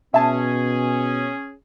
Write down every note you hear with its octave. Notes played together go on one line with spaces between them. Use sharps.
B2 C#4 G#4 E5 A5